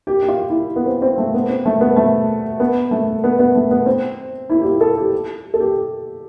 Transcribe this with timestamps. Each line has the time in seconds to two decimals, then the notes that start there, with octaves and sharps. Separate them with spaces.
0.07 G4
0.23 G4
0.28 F4
0.50 E4
0.76 B3
0.86 C4
1.02 C4
1.18 A3
1.34 B3
1.50 C4
1.65 A3
1.81 B3
1.96 A3
2.60 B3
2.91 A3
3.24 B3
3.39 B3
3.55 A3
3.71 B3
3.86 C4
4.50 E4
4.61 G4
4.65 F4
4.81 A4
4.97 G4
5.54 A4
5.60 G4